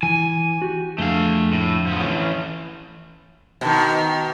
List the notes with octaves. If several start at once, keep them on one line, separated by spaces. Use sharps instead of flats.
E3 G#5
F#4 G4
F2 D3 A3 G#4 F5
A2
F3 B3
E3 C#4
B2 D#3